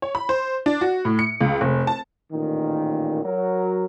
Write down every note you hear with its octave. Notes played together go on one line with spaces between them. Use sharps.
C#5
B5
C5
D4
F#4
A2
C#7
C#2
F1
A5
A1 A#2 D#3
F#3 A#4